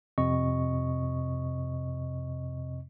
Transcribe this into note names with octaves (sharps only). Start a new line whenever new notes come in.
F2 C3 C4 D#5 C#6